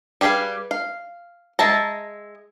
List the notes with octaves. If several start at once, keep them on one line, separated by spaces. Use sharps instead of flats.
G3 G4 G#4 B4 F5
F5
G#3 E5 A5 A#5